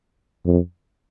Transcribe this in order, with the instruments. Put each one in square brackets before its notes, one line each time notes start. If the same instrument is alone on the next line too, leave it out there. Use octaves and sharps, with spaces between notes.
[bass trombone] F2